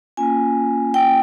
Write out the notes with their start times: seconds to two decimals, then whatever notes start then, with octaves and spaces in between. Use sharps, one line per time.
0.17 A#3 C#4 F4 G#5
0.94 G5